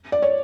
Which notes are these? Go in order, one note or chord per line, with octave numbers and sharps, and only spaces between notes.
D5
C#5